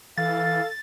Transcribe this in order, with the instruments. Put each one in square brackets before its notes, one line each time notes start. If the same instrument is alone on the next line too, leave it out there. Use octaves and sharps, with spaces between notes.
[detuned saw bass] E3 [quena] A4 [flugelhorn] F5 [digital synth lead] A6